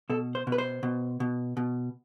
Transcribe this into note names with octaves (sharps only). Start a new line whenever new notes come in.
B2 A4
C5
B2
B4
C5
B2
B2
B2